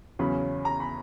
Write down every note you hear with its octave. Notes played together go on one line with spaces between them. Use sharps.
E2 C#3 F#3 C#4 B5
A#5
B5